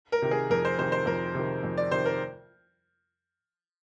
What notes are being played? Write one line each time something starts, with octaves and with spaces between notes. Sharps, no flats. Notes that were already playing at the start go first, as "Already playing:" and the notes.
A#4
C3 D#3
G#4
F2 A#4
C5
C3 D#3 C5
C5
F2 A#4
C3 D#3
F2
D5
C3 D#3 C5
A#4